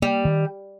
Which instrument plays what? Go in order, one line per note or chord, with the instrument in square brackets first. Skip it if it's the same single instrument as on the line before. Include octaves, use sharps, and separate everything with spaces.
[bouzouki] G3 [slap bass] A#3
[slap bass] D#3